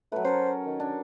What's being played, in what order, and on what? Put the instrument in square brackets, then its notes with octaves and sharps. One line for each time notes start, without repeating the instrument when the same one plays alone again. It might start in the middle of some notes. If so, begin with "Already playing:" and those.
[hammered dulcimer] F#3 B4 [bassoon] A3
[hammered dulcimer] C#4 A4 A#4 [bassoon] C5
[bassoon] D#3
[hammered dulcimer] D4